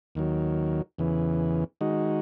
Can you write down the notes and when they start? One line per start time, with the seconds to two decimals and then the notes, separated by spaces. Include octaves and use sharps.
0.15 D#2 D#3 F#3
0.98 E2 C#3 E3
1.81 D#3 G#3 D#4 F#4